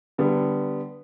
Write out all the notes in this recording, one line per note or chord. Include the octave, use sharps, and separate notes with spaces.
D3 G3 B3